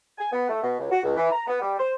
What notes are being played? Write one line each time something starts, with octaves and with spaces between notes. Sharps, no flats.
G#5
B3
A3
B2
C#2
F#4
C#2
E3
A#5
B3
G3
C5